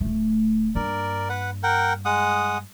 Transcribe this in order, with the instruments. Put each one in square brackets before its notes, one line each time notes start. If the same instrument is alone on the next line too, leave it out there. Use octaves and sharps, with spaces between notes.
[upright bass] D1 A3
[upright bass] G2 A#3 [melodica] A#4 D5
[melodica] B4 F#5
A#4 F#5 G5
G#3 F#5 D#6